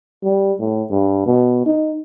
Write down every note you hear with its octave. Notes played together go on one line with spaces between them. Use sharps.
G3
A2
G2
B2
D#4